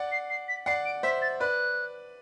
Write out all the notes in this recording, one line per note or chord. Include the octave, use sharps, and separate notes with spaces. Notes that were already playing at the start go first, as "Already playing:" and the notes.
Already playing: D5 F#5
C7
C7
B6
D5 F#5 C7
D7
C5 E5 B6
A6
B4 D5 F#6